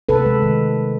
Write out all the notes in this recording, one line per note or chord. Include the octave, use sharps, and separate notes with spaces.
C3 A4 B4
G#3
D#3